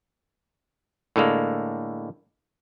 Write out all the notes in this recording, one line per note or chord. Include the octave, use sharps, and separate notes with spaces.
A2 D3 G#3 A#3